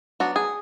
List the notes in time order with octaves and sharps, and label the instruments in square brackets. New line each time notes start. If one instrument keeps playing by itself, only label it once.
[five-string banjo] F#3 B3 D4 F#4
G#4